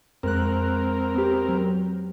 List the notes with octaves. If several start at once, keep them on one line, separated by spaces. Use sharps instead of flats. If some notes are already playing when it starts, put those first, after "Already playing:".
F2 G#3 C4 A#4 F#6
B3 G4
F#3